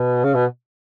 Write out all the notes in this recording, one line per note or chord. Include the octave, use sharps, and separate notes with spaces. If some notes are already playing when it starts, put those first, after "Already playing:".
Already playing: B2
C#3
B2